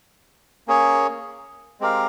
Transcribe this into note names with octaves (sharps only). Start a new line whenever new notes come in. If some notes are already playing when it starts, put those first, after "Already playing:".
A#3 C#4 G#4 C#5
G#3 C4 G4 A#4 F5